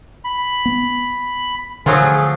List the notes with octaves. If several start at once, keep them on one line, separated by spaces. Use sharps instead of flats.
B5
B3
D3 F3 F#3 A3 G#4